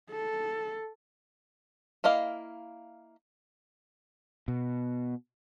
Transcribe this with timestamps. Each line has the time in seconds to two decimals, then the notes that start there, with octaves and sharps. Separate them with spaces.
0.11 A4
2.04 A#3 E4 D#5 F5
4.48 B2